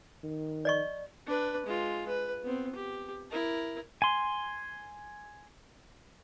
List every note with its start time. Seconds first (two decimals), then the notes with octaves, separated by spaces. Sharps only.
0.23 D#3
0.65 D5 D#5 C#6
1.27 D4 B4
1.66 G#3 F4
2.07 B4
2.43 B3 C4
2.75 G4
3.31 E4 A#4
4.02 G#5 C6